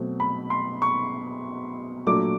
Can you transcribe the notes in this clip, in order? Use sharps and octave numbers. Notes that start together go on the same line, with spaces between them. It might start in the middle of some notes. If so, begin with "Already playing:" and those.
Already playing: B2 F#3 A3 C4
B5
C6
C#6
A#2 F#3 A3 D4 D6